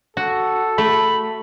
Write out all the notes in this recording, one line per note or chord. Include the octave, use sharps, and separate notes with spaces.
F#4 A4
A3 B5